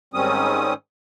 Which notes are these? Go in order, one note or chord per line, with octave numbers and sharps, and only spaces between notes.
G#2 D#3 G3 C4 C#4 D#6